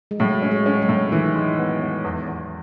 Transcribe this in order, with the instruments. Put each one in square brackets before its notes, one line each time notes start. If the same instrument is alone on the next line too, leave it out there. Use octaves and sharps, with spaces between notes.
[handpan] G#3
[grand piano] A2 [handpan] F#3
[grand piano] C#4
[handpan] G#3
[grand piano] C#4
[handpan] F#3
[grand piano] A2
[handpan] D#3 [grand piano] E3
[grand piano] G#3
B3
B3
E2
E2